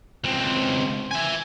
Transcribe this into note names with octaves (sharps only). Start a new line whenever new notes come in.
C#2 C4
E5 G#5